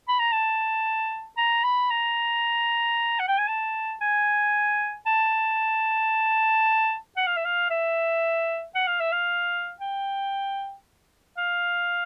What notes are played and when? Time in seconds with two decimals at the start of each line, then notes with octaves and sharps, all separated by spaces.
0.08 B5
0.19 A#5
0.32 A5
1.37 A#5
1.63 B5
1.90 A#5
3.19 F#5
3.28 G5
3.38 G#5
3.48 A5
4.01 G#5
5.06 A5
7.16 F#5
7.27 F5
7.36 E5
7.45 F5
7.70 E5
8.75 F#5
8.87 F5
9.00 E5
9.12 F5
9.80 G5
11.37 F5